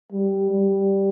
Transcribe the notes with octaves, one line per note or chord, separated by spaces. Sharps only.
G3
G3